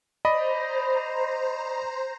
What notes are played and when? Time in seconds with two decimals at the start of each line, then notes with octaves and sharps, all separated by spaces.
0.25 C5 D5 D#5 A#5 B5